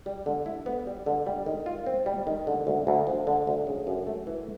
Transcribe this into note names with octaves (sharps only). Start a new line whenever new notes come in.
G3
D3
E4
B3
G3
D3
G3
D#3
F4
C4
G3
D#3
D3
D2
D2
F3
D3
D2
C#3
F#2
A3
E3